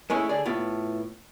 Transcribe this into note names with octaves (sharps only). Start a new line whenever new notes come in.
G#3 A3 C#4 E4
D3 G#4 D5
A2 B3 F4